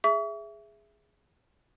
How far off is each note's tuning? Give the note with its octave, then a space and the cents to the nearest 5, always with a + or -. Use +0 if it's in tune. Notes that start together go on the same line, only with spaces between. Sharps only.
G#4 +0 E5 +10 C#6 +45